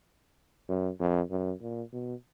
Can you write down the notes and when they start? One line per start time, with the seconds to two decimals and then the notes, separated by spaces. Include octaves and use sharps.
0.68 F#2
1.00 F2
1.30 F#2
1.61 A#2
1.92 B2